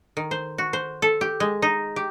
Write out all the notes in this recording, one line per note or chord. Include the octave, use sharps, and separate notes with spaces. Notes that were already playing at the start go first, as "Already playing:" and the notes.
D#3
C5
F#4
C5
A4
G4
G#3
D#4
G4